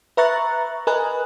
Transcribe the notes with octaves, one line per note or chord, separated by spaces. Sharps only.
B4 E5 A#5 C#6 F#6 A6
A#4 B4 D#5 G#5 F#6